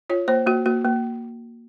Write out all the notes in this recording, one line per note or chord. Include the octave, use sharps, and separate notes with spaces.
F4 C#5
A#3 C5
A#3 F#4
A#3 F#4
A#3